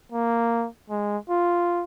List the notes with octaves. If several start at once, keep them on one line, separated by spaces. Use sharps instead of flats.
A#3
G#3
F4